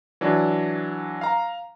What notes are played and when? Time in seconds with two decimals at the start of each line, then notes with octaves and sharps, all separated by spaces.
0.21 E3 F#3 D4
1.21 F5 A#5